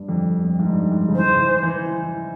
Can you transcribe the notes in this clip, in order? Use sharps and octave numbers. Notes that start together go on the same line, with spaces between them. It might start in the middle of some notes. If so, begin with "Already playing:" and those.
Already playing: G2
F2
F2
G#2
G2
G#2
C#3
E3 C5
E3
E3
E3